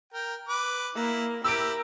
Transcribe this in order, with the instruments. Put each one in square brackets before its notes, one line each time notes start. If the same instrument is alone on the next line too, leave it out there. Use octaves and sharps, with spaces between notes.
[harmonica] A#4 G5
B4 D6
[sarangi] A#3 [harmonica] E4
[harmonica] E4 G4 [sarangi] A#4 [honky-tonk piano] E6 D7